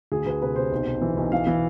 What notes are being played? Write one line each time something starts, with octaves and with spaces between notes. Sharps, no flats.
D2 G#4
D2 B4
C3 B4
C3 C5
B1
B1
E3
B1
E3 F5
E3